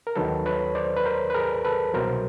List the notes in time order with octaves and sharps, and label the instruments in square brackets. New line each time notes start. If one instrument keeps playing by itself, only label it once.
[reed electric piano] A#4
D#2 D#3 F#3 A4 B4
B4 C#5
C5 D5
B4
A#4 C5
B4
G#4 A#4
A4 B4
C2 B2 F#3 A#4 C5